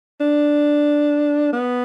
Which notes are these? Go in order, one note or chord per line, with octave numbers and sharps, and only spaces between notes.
D4
B3